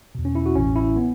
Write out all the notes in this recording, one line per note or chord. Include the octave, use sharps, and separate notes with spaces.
E2 B2
C#4
E4
F#4
A1 A2 E3 C#4
E4
B3